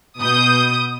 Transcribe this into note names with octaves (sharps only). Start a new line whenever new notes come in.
B2 D#6 G6